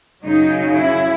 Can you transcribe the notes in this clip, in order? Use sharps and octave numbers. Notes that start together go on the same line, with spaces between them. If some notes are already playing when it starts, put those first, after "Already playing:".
F#2 C#3 F#3 D#4
E4